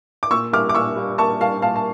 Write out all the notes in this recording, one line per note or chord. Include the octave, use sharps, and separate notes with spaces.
D6
A#2 C#6 E6
G3 A#3 D6 F6
D6
A#2 C#6 E6
G3 A#3
A#2 A5 C#6
G3 A#3 F5 A5
A#2 F5 A5
A5